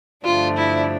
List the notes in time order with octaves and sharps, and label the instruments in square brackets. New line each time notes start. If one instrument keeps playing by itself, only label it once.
[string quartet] G2 D3 F3 A3 D4 [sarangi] F4
[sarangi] E4